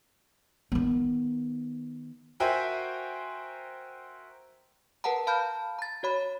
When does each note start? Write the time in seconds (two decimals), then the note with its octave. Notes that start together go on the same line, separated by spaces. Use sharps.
0.72 D#3 B3
2.40 F#4 A#4 C5 E5 G5 G#5
5.04 A#4 B4 F#5 A5 A#5
5.27 F5 A5 B5 F6 G6
5.79 A#5 A6
6.03 F#4 C#5 B5